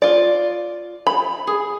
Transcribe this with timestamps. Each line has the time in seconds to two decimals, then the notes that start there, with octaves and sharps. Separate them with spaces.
0.02 F4 D5
1.07 B5
1.47 G#4